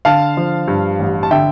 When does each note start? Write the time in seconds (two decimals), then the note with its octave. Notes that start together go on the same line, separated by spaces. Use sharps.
0.05 D3 F5 A5
0.37 F3
0.68 G2
0.99 A1
1.23 A5
1.31 D3 E5 G5